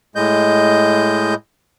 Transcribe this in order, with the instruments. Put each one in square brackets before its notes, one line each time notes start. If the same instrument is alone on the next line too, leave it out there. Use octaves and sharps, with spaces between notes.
[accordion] A2 G#3 D#5 G6